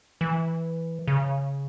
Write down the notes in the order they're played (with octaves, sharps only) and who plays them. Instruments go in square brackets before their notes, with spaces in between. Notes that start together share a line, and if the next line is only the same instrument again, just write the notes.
[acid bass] E3
C#3